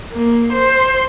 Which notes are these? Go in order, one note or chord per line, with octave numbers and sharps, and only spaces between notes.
A#3
C5